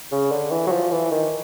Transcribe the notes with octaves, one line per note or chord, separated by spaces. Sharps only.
C#3
D3
E3
F#3
F3
E3
D#3